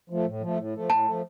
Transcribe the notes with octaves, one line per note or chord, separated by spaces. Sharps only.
F3 A3
A2
F3 A3
A2
F3 A3
A2 A5
F3 A3